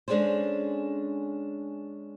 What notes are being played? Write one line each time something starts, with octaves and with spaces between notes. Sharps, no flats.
G#3 C#4 D4 G#4 A4 C5